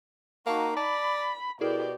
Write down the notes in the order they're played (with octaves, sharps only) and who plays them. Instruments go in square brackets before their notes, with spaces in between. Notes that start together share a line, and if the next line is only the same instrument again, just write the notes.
[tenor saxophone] A#3 [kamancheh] D#4 F#4 [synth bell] F5 A5 C#6
[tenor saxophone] D5 [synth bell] A5 [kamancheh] B5
[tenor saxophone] B2 [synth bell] E4 G#4 A#4 [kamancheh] G4 D5